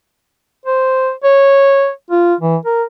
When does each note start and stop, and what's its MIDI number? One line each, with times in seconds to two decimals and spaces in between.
0.66 1.11 72
1.24 1.90 73
2.11 2.35 65
2.41 2.57 52
2.66 2.83 70